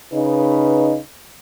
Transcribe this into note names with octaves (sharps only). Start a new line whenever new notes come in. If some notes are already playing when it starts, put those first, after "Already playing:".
C#3 D#4 B4